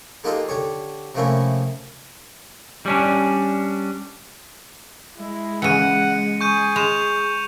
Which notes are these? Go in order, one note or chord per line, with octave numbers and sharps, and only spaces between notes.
G#3 A#3 D#4 F4 G4 A4
D3 G4 C#5
C3 F3 A3 A#3 C#4 E4
G3 C#4 D4
G#3 E4
C#3 E3 F#5 C#7 D#7
G#4 C#6 G6 D#7
G#3 E7 F7